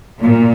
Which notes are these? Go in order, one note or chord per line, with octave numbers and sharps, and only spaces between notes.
A#2